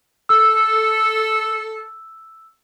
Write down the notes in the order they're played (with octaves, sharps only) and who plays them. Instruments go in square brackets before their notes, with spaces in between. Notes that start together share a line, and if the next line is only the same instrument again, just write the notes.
[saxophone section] A4 [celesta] E6